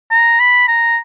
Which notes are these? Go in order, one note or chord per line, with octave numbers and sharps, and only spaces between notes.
A#5
B5
A#5